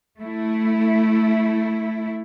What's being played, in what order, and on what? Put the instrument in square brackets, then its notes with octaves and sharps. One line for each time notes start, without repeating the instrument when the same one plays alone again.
[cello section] A3 E4